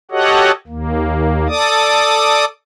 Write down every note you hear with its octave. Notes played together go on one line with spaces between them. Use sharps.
F#4 G4 A4 C#5 D#5 F#5
D#2 A#3
A4 D5 D6 D#6